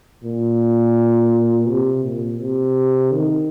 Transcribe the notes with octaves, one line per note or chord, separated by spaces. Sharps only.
A#2
C3
A#2
C3
D#3